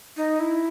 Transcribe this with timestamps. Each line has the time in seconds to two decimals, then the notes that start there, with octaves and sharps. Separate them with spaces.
0.17 D#4
0.40 E4